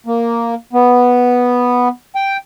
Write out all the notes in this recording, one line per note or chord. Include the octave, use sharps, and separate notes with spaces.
A#3
B3
G5